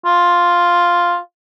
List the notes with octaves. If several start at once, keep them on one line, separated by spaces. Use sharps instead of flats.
F4